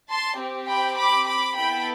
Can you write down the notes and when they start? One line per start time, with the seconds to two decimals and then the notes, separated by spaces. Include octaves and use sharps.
0.11 A5 C6
0.41 C4 G4
0.70 G5 B5
0.99 B5 D6
1.29 B5 D6
1.58 B3 E4 A4 G5 B5